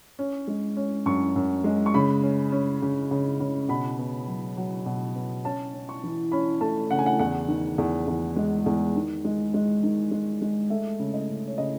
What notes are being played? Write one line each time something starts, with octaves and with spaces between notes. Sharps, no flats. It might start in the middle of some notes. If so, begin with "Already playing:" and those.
C#4
G#3
C#4
F#2 C#6
F#2
G#3
C#6
C#3 B5
C#4
C#4
C#3
C#3
C#3
B2 B5
B3
F#3
F#3
B2
B3
C#4 A5
C#4
C#6
E3
C#4 B5
A3 A5
C#3 F#5
G#5
F#5
E2 F#5
D#3
E2
E2
G#3
E2
D#3
G#3
G#3
D#3
G#3
G#3
A3 E5
C#3
D#5
C#3
C#5
C#3 D#5